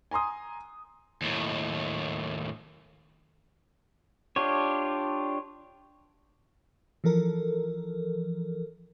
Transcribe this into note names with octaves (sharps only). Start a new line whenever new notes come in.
G#5 A#5 C6 D#6
D#2 A2
D4 F4 G4 C#5
E3 F3 A4 A#4